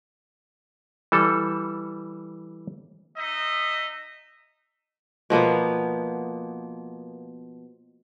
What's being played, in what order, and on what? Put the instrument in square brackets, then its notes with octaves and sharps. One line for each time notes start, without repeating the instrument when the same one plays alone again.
[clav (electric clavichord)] E3 G3 A4
[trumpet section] D#4 D#5 E5
[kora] B2 F3 A#3 B3